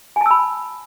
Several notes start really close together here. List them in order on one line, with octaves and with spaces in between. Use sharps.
G#5 A5 E6 B5